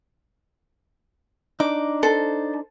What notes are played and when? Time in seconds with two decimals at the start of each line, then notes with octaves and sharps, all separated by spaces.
1.60 D4 D#4 D6
2.03 A4 C5